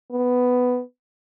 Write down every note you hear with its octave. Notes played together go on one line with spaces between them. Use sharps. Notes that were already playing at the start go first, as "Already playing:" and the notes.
B3